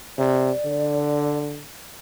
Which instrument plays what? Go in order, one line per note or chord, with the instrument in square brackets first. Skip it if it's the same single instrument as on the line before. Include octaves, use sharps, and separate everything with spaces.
[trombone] C3 [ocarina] D5
[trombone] D3